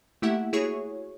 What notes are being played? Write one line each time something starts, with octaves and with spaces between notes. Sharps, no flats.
A3 A#3 E4 G4 E5 F#5
E4 F#4 G#4 C#5 C#6